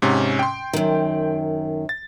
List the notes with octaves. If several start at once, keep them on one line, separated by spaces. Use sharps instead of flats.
G#2 C3 C#4
G5 C6
F#2 D#3
A6